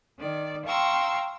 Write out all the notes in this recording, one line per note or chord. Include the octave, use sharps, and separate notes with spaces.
D#3 D5
F5 G5 A#5 C6 C#6 E6